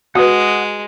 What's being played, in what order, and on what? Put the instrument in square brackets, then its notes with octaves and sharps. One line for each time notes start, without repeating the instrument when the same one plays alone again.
[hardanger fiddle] G#3 [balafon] F#4 B4 [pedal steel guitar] F#5 D#6